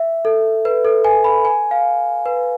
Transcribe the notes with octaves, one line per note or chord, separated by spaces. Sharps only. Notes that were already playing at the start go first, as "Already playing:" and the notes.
Already playing: E5
A4
B4
A4
G#5
B5
G#5
F5
B4